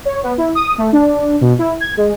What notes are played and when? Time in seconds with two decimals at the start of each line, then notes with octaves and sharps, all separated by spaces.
0.05 C#5
0.23 B3
0.38 E4
0.55 D#6
0.78 A3
0.92 D4
1.41 B2
1.59 E4
1.80 G#6
1.97 G#3